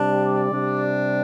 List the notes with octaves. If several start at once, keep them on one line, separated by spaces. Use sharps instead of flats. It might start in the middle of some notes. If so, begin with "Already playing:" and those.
Already playing: C3 G3 D4
D5
C3 G3 D4